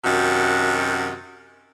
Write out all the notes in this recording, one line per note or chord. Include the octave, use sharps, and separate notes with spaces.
F#2 C3 D#3 F#4